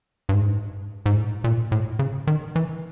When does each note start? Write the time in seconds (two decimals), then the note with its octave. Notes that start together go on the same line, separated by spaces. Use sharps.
0.29 G2
0.34 G#2
1.06 G#2
1.16 A2
1.44 A#2
1.72 A2
1.99 C#3
2.27 D#3
2.56 E3